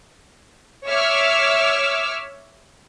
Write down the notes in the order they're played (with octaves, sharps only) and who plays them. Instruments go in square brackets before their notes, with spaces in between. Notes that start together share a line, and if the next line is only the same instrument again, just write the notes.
[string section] C#5 E5 D6 E6 F6